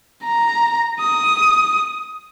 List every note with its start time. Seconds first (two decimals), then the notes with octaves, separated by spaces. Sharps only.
0.25 A#5
1.00 D#6